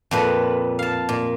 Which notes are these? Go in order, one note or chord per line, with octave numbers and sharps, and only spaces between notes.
F2 A#2 B4
F5 A5
A#2